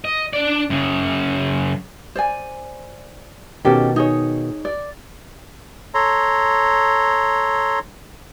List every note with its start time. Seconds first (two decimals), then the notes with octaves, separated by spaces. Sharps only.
0.05 D#5
0.33 D4 D5
0.70 F#2 C#3
2.15 C5 D5 G#5
3.65 B2 D#3 C#4 G4 A4
3.96 D#4 G#4 C#5
4.65 D5
5.94 A4 C#5 A#5 C6